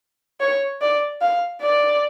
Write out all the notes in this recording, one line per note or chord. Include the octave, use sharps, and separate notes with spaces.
C#5
D5
F5
D5